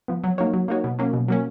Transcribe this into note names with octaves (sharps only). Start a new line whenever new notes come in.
F3 B3
F#3
A#3 D#4 F#4 C#5
F#3
A#3 D#4 F#4 C#5
B2
F#3 A#3 C#4
B2
F#3 A#3 C#4